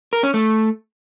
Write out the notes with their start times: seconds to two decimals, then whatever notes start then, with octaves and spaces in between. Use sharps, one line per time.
0.13 A#4
0.23 C#4
0.34 A3